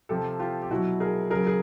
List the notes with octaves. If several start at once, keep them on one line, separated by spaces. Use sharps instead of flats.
C3 F3 G4 A4
F4 G4
G4
B2 F#3 E4 F#4
G#4 A#4
C#3 F#3 G#4 A#4
G#4